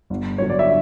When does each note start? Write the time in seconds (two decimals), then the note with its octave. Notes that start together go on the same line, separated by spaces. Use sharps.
0.10 G1
0.38 G2 D3 F#3 C#5
0.50 D5
0.59 E5